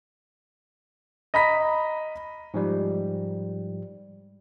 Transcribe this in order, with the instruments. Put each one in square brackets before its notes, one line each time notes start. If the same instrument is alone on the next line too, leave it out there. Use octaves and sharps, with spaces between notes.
[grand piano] D#5 A#5 B5 B6
[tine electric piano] G#2 F3 G3